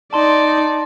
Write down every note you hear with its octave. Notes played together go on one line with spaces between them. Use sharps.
D#4 D5 A5 C6